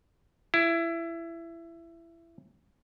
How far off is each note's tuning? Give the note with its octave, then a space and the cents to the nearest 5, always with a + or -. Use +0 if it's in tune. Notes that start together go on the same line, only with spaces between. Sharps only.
E4 +20